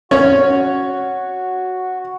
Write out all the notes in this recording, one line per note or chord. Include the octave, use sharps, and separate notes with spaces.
C#4 F#4 C#5